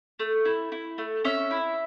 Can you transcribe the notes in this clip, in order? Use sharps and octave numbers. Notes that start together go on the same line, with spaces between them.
A3
E4
E4
A3
C#4 E5
E4